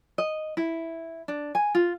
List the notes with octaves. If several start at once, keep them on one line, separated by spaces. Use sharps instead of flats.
D#5
E4
D4
G#5
F4